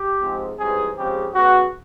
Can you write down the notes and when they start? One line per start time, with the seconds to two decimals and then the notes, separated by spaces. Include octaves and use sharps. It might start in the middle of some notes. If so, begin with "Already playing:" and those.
Already playing: G4
0.22 G#2 F3 G#3 C4
0.59 G#2 E3 G3 C4 G#4
0.97 C#3 F3 G#3 C4 G4
1.35 C#3 F#3 B3 F#4